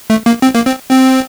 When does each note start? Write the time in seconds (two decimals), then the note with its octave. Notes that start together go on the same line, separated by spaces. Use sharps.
0.10 A3
0.26 A#3
0.42 C4
0.55 A#3
0.66 C4
0.91 C4